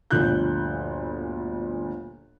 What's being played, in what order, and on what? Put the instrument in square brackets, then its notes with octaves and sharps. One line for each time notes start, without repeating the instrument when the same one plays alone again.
[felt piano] G1 D2 A#2 F3 F#6 G6